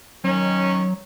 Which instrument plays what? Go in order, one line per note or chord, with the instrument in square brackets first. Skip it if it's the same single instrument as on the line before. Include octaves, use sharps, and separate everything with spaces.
[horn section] D#3 C#4 [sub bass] F#3